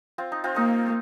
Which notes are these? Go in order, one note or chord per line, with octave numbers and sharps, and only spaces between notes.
C4 F4
D#4
C4 F4
A#3 D#4